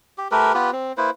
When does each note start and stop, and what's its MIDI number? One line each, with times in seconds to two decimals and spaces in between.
0.18 0.28 67
0.32 0.53 57
0.32 0.53 67
0.32 0.53 70
0.32 0.53 71
0.54 0.71 59
0.54 0.71 65
0.54 0.71 67
0.54 0.71 71
0.72 0.92 60
0.97 1.10 58
0.97 1.10 64
0.97 1.10 71
0.97 1.10 72